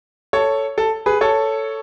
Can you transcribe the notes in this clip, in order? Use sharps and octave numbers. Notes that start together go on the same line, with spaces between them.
A4 C#5
A4
G#4 B4
A4 C#5